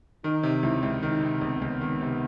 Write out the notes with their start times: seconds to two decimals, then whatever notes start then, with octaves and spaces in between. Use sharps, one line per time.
0.24 D#3 D#4
0.43 C3
0.63 C#2 E4
0.83 C#2
1.03 D#3 D#4
1.23 C3
1.41 C#2 B3
1.62 C#2
1.81 D#3
2.01 C3